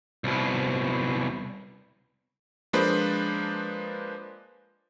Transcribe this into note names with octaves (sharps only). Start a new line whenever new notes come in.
C2 B2
F3 G#3 A#3 D4 B4 C5